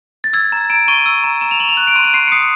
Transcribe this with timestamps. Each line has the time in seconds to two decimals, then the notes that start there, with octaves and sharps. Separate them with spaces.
0.24 A6
0.33 E6 G#6
0.52 A#5
0.70 A#5 D7
0.88 C#6 D#7
1.06 E6
1.24 A#5
1.41 A#5 E7
1.51 F7
1.60 C#6 F#7
1.69 F7
1.77 F#6
1.87 D7
1.96 C6 D#7
2.05 D7
2.14 C6 C7
2.28 C#7
2.32 D#6 C7